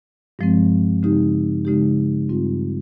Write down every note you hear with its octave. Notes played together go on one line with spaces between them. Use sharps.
G2 F3 G#3 C4
C#3 G#3 D#4 G4
C#3 G#3 D#4 G4
G2 G3 C4 F4